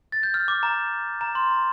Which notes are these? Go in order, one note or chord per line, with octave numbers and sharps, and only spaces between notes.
A6
G6
F6
D6
A#5
A#5
C6
A#5